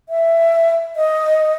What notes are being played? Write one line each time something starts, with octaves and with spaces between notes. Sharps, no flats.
E5
D#5